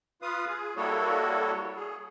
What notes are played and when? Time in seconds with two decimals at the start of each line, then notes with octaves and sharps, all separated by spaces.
0.22 F4 B4 F5 D#6
0.47 G#4
0.76 G3 A#3 E4 F#4 A4 C#5
1.76 G#4